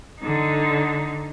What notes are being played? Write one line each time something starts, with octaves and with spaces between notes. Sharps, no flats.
D3 D#4